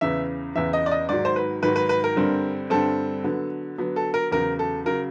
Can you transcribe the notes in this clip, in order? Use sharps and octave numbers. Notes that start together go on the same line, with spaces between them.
E2 C#3 E3 E5
E2 C#3 E3 E5
D#5
D5
D#5
G#2 D#3 F#3 D5
C5
B4
G#2 D#3 F#3 B4
B4
B4
A#4
G2 D3 G3 C4
G2 D3 G3 C4 A4
D3 F#3 B3
D3 F#3 B3
A4
A#4
E2 C#3 F#3 A#4
A4
C#3 F#3 A#4